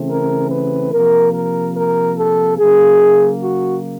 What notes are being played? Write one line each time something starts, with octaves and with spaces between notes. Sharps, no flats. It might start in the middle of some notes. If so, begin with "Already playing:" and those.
Already playing: C#3 E3 A3 C4
A#4
B4
C3 F3 A#3 A#4
A#4
A#4
A4
C#3 F#3 A#3 G#4
F#4